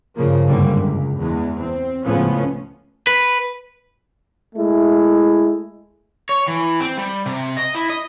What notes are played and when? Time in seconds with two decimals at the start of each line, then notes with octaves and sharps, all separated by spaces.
0.16 G2 C#3 F3 A#3
0.46 F#1 C2 G#2 D3 G3 A#3
0.75 C#2
1.18 E2 G#3
1.61 C4
2.04 C#2 A2 C#3 F3 B3 C#4
3.07 B4
4.56 G#3 A3 E4
6.29 C#5
6.48 E3
6.80 C4
6.98 G3
7.26 C3
7.57 D#5
7.75 E4
7.90 D#5